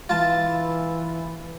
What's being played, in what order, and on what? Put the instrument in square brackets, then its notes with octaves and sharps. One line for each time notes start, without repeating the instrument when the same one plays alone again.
[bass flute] E3 [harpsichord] F4 A5